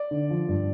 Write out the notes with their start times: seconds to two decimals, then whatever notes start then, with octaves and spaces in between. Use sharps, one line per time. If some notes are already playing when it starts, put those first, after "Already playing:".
Already playing: D5
0.11 D3
0.31 F3
0.48 G2